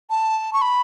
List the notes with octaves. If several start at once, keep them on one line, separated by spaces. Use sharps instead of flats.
A5
C#6
B5